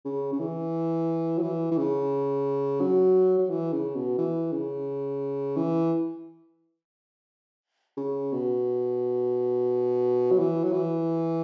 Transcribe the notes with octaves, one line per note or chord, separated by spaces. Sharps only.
C#3
C#3
E3
F#3
E3
E3
C#3
F#3
F#3
E3
C#3
B2
E3
C#3
E3
C#3
B2
F#3
E3
F#3
E3